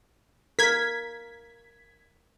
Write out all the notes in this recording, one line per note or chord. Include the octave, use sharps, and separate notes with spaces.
A#4 G#6 B6